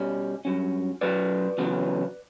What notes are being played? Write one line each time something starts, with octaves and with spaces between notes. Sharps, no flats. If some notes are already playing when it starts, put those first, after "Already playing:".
Already playing: B2 G3 C#4
G2 F#3 C#4
B1 A2 F#3 C#4 B4 D5
E2 C#3 F#3 B3